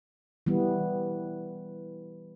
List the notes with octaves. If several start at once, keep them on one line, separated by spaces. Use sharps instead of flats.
E3 G3 B3